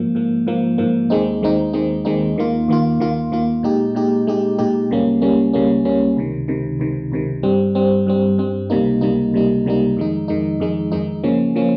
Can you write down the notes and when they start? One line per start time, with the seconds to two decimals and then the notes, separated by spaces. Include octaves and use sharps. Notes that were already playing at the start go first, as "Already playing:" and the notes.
Already playing: G#2 F3 A#3
0.15 G#2 F3 A#3
0.47 G#2 F3 A#3
0.78 G#2 F3 A#3
1.10 D#2 D#3 G#3 C4 D#4
1.42 D#2 D#3 G#3 C4 D#4
1.73 D#2 D#3 G#3 C4 D#4
2.05 D#2 D#3 G#3 C4 D#4
2.36 D#2 D#3 A#3 F4
2.68 D#2 D#3 A#3 F4
3.00 D#2 D#3 A#3 F4
3.32 D#2 D#3 A#3 F4
3.63 A#2 G#3 D#4 G4
3.95 A#2 G#3 D#4 G4
4.27 A#2 G#3 D#4 G4
4.58 A#2 G#3 D#4 G4
4.90 C#2 C#3 G3 A#3 C#4
5.22 C#2 C#3 G3 A#3 C#4
5.53 C#2 C#3 G3 A#3 C#4
5.85 C#2 C#3 G3 A#3 C#4
6.17 C#2 C3 D#3
6.48 C#2 C3 D#3
6.80 C#2 C3 D#3
7.12 C#2 C3 D#3
7.43 G2 G3 C4
7.75 G2 G3 C4
8.07 G2 G3 C4
8.38 G2 G3 C4
8.70 C#2 C3 G3 A#3 D#4
9.01 C#2 C3 G3 A#3 D#4
9.33 C#2 C3 G3 A#3 D#4
9.65 C#2 C3 G3 A#3 D#4
9.96 F2 D#3 G#3 D#4
10.28 F2 D#3 G#3 D#4
10.60 F2 D#3 G#3 D#4
10.92 F2 D#3 G#3 D#4
11.23 C#3 F3 A#3 C#4
11.55 C#3 F3 A#3 C#4